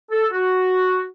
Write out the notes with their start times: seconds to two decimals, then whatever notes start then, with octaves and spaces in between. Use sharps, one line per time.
0.11 A4
0.32 F#4